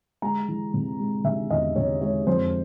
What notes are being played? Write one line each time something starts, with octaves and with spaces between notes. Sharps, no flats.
G#3 A#5
E3
C3
G#3
C3 E5
E2 D#5
C3 C#5
G#3 C#5
F2 C5